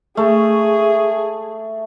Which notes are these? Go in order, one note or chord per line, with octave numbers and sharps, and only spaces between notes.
A3 G#4